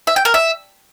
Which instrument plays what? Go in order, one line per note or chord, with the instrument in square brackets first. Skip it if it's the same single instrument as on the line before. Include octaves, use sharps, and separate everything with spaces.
[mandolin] E5
G5
A#4
E5